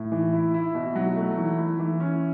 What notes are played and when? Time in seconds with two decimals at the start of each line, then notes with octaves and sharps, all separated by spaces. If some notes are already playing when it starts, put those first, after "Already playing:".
Already playing: A2
0.12 E3
0.33 E4
0.54 E4
0.75 B2
0.95 F#3
1.16 A3
1.38 E3
1.58 E4
1.79 E3
2.00 C#4